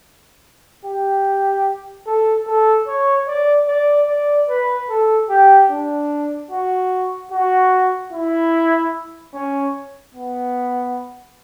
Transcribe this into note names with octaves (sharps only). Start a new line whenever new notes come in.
G4
A4
A4
C#5
D5
D5
D5
B4
A4
G4
D4
F#4
F#4
E4
C#4
B3